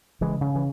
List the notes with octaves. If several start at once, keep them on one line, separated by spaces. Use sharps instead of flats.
C#3 E3 G#3
C#3
E3